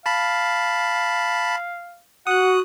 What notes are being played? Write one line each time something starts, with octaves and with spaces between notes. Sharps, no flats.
F5 A5 B5
F#4 F#5 D#6 F#6